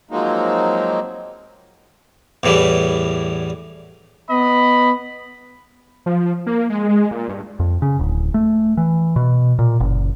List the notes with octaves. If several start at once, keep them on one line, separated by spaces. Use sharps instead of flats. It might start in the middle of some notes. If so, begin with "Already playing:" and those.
F3 F#3 G#3 A#3 C4 D#4
E2 A2 E3 G3
B3 D#5 B5
F3
A#3
G#3
G#3
A#2
G2
F2
C#3
D1
A3
E3
B2
A#2
F#1